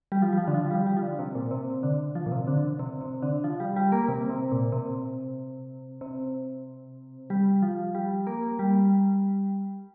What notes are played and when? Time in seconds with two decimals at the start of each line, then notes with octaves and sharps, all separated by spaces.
0.12 G3
0.22 F3
0.33 G3
0.38 F3
0.48 D3
0.54 F3
0.71 G3
0.87 G3
0.97 F3
1.02 D3
1.19 C3
1.35 A#2
1.51 C3
1.83 D3
2.15 F3
2.26 A#2
2.32 C3
2.47 D3
2.79 C3
3.01 C3
3.23 D3
3.44 F3
3.60 G3
3.76 G3
3.92 A#3
4.09 C3
4.29 C3
4.52 A#2
4.72 C3
6.01 C3
7.30 G3
7.62 F3
7.95 G3
8.27 A#3
8.59 G3